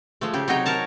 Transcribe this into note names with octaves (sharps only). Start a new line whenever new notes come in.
F3 G#3 A3
C#3 G4
C3 F#3 D#4 C#5 D#5 G5
A#4 C#5 A5 A#5